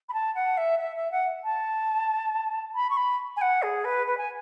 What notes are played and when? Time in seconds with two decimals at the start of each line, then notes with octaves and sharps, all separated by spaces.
0.09 B5
0.13 A5
0.35 F#5
0.57 E5
0.79 E5
0.96 E5
1.11 F#5
1.44 A5
2.75 B5
2.90 C#6
2.97 B5
3.36 G#5
3.41 F#5
3.62 G#4
3.85 B4
4.07 B4
4.17 G#5